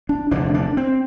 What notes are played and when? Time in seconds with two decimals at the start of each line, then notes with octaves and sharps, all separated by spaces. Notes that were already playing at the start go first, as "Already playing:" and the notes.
0.09 D4
0.31 F1 E2 D3 D4
0.54 D4
0.77 C4